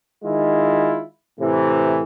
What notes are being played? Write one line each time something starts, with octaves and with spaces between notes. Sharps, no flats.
D#3 G#3 E4 F4
A2 C3 E3